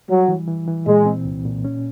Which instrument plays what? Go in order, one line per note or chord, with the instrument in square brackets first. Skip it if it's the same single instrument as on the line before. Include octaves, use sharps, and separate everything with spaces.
[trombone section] F#3 [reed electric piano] G3
[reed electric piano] E3
E3
E3
[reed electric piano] A#2 [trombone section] G#3
[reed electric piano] C4
C2
A#2
C#4